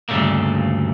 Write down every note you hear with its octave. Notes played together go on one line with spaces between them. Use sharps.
D2 G2 A#2 C#3 A3 A#3